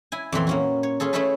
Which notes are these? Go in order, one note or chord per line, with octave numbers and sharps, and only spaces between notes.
E4 G#5
F2 A#2 E3 C4
A#3 C#4 F#4
C#5
C#4 F4 G#4 A4
A3 C#4 E4 G#4 A4 B4